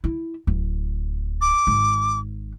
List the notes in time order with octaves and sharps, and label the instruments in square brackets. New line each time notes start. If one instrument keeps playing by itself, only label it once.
[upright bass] E4
D1
[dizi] D6
[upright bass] G#1